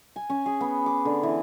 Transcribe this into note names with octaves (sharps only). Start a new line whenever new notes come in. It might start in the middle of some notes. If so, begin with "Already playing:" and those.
G#5
C#4
G#4
B3
D6
D3
E3